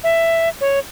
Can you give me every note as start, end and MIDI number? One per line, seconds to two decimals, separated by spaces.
0.04 0.49 76
0.61 0.79 73